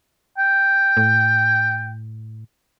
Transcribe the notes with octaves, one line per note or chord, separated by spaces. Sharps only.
G5
A2